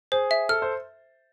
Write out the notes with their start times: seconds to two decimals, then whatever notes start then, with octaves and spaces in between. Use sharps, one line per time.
0.12 G#4 C5
0.31 E5
0.49 A4 F6
0.62 C5